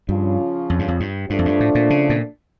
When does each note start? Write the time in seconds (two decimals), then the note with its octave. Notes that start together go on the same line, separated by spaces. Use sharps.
0.09 G2 C#3 F3 C#4 F4
0.70 F2
0.79 G2
0.88 F2
1.00 G2
1.30 G2 F3 A3 D4
1.39 F2
1.45 G2
1.60 A2
1.75 A#2
1.90 C#3
2.10 A#2